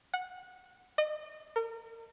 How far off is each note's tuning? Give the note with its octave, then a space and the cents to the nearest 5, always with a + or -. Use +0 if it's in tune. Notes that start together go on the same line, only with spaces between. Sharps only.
F#5 -15
D#5 -35
A#4 -35